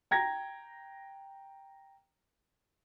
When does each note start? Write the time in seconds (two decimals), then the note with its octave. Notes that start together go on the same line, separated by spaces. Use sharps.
0.11 G5 A#5 G#6 A#6